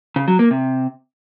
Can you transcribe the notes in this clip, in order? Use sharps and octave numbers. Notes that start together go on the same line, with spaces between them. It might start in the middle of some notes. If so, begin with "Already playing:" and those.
C#3
F#3
A#3
C3